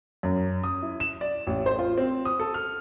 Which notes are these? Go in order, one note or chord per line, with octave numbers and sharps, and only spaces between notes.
F#2
D#6
E4
E7
D5
A1
C5
F4
C4
D#6
A4
F6